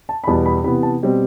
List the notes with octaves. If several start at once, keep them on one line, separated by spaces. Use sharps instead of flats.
A5
B5
E2 B2 G3 B3 A5
B5
C3 E3 B3 B5
A5
B2 G3 C4